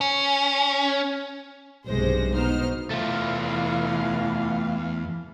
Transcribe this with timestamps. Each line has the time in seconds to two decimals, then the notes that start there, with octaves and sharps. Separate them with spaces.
0.01 C#4
1.87 B1 G2 C3 G#3 C5 A#6
2.32 B2 D#4 C5 F6
2.90 E2 E3 A3 F4 E5 F5